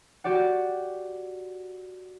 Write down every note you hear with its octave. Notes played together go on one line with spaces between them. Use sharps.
F#4 G4 D5 F#5